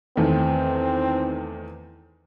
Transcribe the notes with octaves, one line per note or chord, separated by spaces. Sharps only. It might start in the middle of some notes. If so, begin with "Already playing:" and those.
E2 D#3 A3 C4